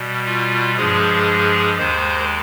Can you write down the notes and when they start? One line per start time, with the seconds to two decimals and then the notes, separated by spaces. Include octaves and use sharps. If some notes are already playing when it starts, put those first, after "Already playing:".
Already playing: B2 G3
0.26 F4
0.77 G2 F3 G#3 G#4
1.79 D#2 D#3 G#3 C5